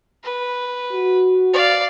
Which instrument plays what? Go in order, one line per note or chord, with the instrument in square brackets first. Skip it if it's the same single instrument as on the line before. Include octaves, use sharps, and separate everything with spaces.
[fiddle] B4
[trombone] F#4
[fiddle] D5 F5